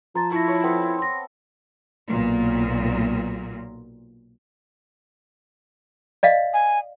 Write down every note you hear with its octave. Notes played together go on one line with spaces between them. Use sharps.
F3 C5 A5 A#5 A6
E4 A5 C#6 A#6
C#5 B5
B3 C4 A4
C6 A#6
B1 A#2
D5 D#5 F5
G#5